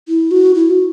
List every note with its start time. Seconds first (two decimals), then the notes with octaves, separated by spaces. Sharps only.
0.08 E4
0.31 F#4
0.54 E4
0.70 F#4